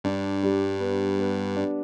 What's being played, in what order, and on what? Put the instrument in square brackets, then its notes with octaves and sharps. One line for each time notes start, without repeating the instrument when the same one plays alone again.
[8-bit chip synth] G2 [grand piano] D4
[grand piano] G3
B3
B3
D4